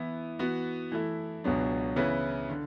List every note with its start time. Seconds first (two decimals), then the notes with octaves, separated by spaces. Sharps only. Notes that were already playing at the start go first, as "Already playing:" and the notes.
Already playing: E3 B3 E4
0.39 E3 B3 F#4
0.92 E3 A3 E4
1.44 C#2 B2 F#3 B3 D4
1.96 C#3 E3 B3 E4 B4
2.50 D3